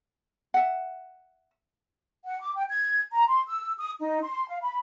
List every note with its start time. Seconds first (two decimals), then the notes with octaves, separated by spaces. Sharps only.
0.54 E5 F#5
2.25 F#5
2.41 D6
2.57 G5
2.68 G#6
3.12 A#5
3.28 C6
3.47 E6
3.78 D#6
3.99 D#4
4.22 C6
4.48 F5
4.62 B5